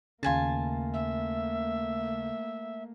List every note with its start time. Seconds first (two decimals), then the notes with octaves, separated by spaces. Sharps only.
0.23 D#2 C#3 A3 A#3 F4 G#5 A5
0.93 E5